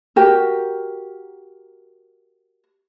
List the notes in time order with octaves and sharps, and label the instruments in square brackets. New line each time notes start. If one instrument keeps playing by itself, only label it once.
[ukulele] F#4 G4 A#4